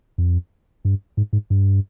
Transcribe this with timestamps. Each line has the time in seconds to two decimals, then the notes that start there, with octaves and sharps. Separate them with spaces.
0.18 F2
0.85 G2
1.17 G#2
1.33 G#2
1.50 G2